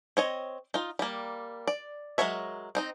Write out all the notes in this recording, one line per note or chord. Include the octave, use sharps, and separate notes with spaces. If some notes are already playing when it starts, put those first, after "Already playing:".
C4 C#5 D#5
D#4 F4
G3 A#3
D5
F#3 G#3 A#4 C#5 E5
C4 D#4 D#5